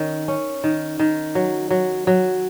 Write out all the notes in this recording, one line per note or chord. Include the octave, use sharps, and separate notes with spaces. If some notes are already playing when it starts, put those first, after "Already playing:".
Already playing: D#3 C#4
C#4
D#3
D#3
F#3
F#3
F#3